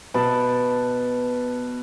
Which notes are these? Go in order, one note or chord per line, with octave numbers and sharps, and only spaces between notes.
B2 A5 B5